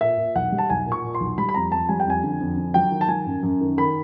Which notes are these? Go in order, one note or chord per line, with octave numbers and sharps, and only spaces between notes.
A#2 E5
A#2
B1 F#5
G3
A5
B1 G#5
A#2
C#6
A#2
C6
B1
G3 B5
B5
F2 A#5
F2 A5
G3 G#5
G5
F2 G#5
D3
F2
D3
F#3 G5
D#3
A5
F#3 G#5
F#2
F#2
D#3
D#3 B5